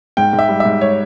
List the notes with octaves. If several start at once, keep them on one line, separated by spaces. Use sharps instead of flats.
G#2 G5
G#2
E5
G3
E5
G#2
C#5